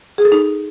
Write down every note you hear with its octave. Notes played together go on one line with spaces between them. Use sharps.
G#4
A4
D#4